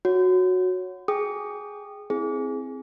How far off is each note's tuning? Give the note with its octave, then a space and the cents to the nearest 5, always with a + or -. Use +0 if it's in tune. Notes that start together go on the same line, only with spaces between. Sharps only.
F#4 -10 C#5 +0
G#4 +0 G5 +0 D#6 -25
C4 +0 E4 -10 G#4 +5